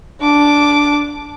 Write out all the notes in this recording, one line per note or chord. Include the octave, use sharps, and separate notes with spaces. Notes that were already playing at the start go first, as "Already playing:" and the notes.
D4 D6